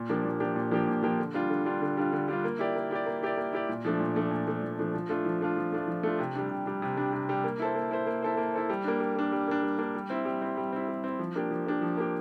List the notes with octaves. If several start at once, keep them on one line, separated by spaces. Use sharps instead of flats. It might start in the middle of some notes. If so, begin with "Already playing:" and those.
Already playing: A#2
F3 A#3 D4 G4
A#2
F3 A#3 D4 G4
A#2
F3 A#3 D4 G4
A#2
F3 A#3 D4 G4
D3
G3 D4 F4
D3
G3 D4 F4
D3
G3 D4 F4
D3
G3 D4 F4
A#3
E4 G4 D5
A#3
E4 G4 D5
A#3
E4 G4 D5
A#3
E4 G4 D5
A#2
F3 A3 D4
A#2
F3 A3 D4
A#2
F3 A3 D4
A#2
F3 A3 D4
F3
A3 D4 F4
F3
A3 D4 F4
F3
A3 D4 F4
F3
A3 D4 F4
C3
G3 D4
C3
G3 D4
C3
G3 D4
C3
G3 D4
A#3
E4 A4 C5
A#3
E4 A4 C5
A#3
E4 A4 C5
A#3
E4 A4 C5
G3
A#3 D4
G3
A#3 D4
G3
A#3 D4
G3
A#3 D4
G3
C4 E4
G3
C4 E4
G3
C4 E4
G3
C4 E4
F3
A#3 D4 G4
F3
A#3 D4 G4
F3
A#3 D4 G4